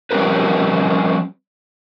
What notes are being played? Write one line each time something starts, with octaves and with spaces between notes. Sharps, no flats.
F3 G3 C4 C#4 A#4 B4